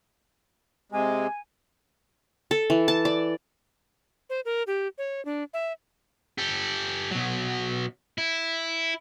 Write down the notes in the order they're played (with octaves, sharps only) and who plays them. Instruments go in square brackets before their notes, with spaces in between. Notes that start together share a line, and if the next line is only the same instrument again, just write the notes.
[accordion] C3 G#3 [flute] G#5
[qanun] A4
E3
A5
D5
[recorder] C5
A#4
G4
C#5
D4
E5
[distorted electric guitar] G4 A4
B2 F#3
E4